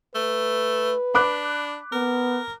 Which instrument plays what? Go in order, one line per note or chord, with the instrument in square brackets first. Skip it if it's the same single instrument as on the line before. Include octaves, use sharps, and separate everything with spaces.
[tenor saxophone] A3 [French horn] B4
[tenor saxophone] D4 [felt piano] B5 D6 F#6
[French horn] B3 [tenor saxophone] A#4